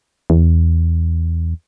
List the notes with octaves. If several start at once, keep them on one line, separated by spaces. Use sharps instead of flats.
E2